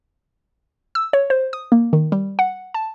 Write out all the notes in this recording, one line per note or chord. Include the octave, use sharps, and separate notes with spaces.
E6
C#5
C5
D#6
A#3
D#3
G3
F#5
A5